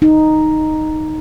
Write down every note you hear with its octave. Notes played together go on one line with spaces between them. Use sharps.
D#4